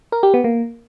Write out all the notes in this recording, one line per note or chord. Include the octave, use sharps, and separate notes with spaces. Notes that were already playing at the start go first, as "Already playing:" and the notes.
A#4
G4
B3
A#3